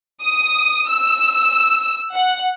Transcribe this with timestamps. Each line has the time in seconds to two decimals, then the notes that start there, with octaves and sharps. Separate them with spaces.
0.22 D#6
0.89 E6
2.14 F#5